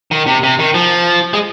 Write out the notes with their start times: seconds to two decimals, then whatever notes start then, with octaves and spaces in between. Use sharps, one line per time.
0.11 D#3
0.26 C3
0.43 C3
0.59 D#3
0.74 F3
1.33 G#3